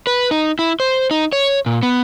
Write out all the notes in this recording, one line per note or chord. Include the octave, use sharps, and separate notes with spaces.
B4
D#4
E4
C5
D#4
C#5
A#2
B3